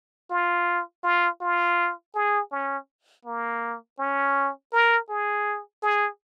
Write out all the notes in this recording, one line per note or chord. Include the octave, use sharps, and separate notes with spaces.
F4
F4
F4
G#4
C#4
A#3
C#4
A#4
G#4
G#4